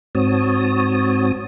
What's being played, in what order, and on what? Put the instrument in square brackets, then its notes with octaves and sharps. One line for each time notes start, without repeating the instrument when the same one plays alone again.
[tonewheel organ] G#2 C4 F#4 C#5 A5 D#6